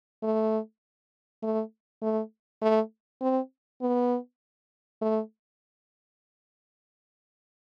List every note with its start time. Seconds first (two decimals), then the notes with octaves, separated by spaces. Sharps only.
0.23 A3
1.43 A3
2.02 A3
2.62 A3
3.21 C4
3.81 B3
5.02 A3